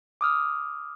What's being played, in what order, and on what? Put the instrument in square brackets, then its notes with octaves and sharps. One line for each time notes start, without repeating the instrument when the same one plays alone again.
[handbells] D6 D#6 F6